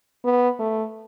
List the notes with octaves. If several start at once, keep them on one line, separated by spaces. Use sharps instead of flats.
B3
A3